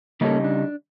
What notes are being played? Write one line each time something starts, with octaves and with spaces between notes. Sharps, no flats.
C#3 G3 A#3 C#4 D#4 A4
D4